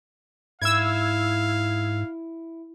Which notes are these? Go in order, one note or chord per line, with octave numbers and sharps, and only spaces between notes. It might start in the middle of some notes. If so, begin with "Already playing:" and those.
G#2 E4 F5 E6 G#6